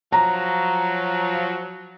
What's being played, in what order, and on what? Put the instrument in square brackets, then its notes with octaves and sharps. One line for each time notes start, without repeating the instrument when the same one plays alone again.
[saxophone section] F3 F#3 [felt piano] A#5